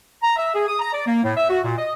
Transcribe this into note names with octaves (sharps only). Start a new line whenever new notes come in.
A#5
E5
G#4
D#6
A#5
D5
A#3
A2
E5
F#4
A#2
D#5